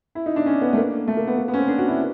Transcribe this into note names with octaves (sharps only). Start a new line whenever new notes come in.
E4
D#4
D4
C#4
B3
A3
A#3
A3
A#3
B3
A#3
B3
C#4
C4
D4
F#4
E4